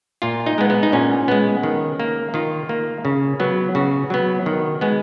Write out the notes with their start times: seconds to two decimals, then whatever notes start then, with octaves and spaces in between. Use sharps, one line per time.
0.22 A#2 F4
0.46 D#4
0.58 G#3 B3
0.70 B3
0.83 D#4
0.92 A#2 C#4
1.28 G#3 B3
1.63 D#3
2.00 A#3
2.34 D#3 F4
2.69 A#3
3.05 C#3
3.40 F#3 B3
3.75 C#3 F#4
4.10 F#3 B3
4.46 D#3
4.81 G#3 B3